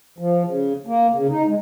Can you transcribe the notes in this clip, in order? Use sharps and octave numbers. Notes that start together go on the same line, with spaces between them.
F3
C#3
A#3
C#3
D#4
G#3